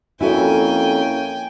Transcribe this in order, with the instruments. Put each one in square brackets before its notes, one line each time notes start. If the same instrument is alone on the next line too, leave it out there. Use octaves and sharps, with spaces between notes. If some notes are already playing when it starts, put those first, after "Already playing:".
[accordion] F2 [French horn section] A#3 C#4 [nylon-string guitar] E4 F#4 A4 [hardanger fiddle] G5 G#5